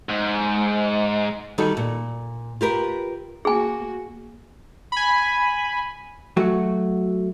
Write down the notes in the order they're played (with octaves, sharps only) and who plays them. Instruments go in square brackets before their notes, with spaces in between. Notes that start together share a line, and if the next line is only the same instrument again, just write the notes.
[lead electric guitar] G#2
[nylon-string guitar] D#3 G3 D#4 F#4 A4
A#2
F4 G4 A#4 B4
[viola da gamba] A#3 F#4 [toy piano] G#4 G#5
[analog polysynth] G#5 B5
[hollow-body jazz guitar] F#3 A3 F#4